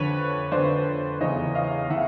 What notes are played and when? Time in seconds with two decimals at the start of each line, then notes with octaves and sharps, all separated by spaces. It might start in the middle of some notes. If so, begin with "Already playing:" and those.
Already playing: F2 D3 B4 C#5
0.52 F2 D3 C5 D5
1.21 E2 C#3 E3 C#5 D#5
1.55 D#5 F5
1.90 C#3 E3 E5 F#5